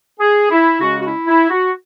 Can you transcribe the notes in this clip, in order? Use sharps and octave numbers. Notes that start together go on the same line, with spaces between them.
G#4
E4
C#3 G#3 C#4 F#4
F#4
E4
E4
F#4